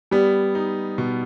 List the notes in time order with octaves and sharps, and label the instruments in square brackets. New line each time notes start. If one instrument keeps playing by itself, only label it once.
[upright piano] G3 [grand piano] B3
[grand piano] D#4
B2